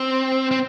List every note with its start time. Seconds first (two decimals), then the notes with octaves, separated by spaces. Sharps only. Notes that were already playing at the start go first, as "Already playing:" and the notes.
Already playing: C4
0.51 C4